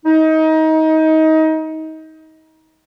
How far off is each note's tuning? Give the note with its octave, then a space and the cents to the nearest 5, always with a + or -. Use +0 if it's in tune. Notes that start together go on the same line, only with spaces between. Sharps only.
D#4 +25